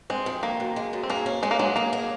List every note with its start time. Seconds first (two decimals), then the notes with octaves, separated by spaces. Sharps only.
0.10 G#3 C4
0.26 F2
0.43 D#3 A#3
0.60 F#2
0.76 G#3
0.93 F#2
1.03 C4
1.10 A#3 G#4
1.26 C#4
1.43 G#3 C#4
1.51 A#3
1.59 F#3 G#3
1.76 A#3 G#4
1.93 G#4